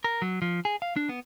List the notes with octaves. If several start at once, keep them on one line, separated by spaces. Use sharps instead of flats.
A#4
F#3
F3
G#4
F5
D4
B3